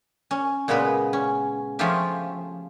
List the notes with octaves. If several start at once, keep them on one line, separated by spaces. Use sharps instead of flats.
C#4
A#2 C#3 G#3 B3 B4 B5
C#4
F3 A3 C#4 F4 G4 E5